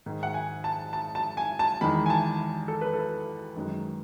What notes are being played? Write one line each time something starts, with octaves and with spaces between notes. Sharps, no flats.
G#2 D#3 G#3
F#5
G#5
A5
A5
A5
G#5
A5
E2 D#3 G#3 B5
G#5
A5
A4
B4
A4
F#2 D#3 G#3